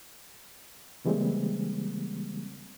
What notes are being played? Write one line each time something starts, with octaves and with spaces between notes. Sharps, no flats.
C#3 E3 G3 G#3 A#3 C4